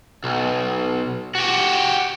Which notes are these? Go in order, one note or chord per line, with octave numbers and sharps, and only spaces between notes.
B1
F#4 G4